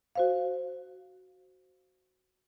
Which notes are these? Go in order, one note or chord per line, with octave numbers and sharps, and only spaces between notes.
F#4 C5 F5